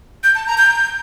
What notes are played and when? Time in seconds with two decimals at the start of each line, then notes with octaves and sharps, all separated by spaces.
0.24 G6
0.35 A5
0.46 A#5
0.58 G6